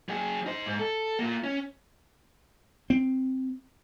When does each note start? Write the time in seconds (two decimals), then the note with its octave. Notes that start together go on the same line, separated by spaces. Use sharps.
0.09 F#3 G#4
0.46 D#4 C5
0.66 G#2
0.79 A4
1.19 A#3 F4
1.44 C#4
2.90 C4